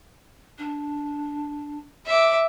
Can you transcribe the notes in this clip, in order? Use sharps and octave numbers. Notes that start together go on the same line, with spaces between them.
D4
E5 D6